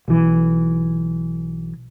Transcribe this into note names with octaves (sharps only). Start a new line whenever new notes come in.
B1 E3